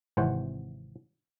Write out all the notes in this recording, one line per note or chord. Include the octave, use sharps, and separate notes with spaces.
G#1 C3 E3 C5 C#5 F#5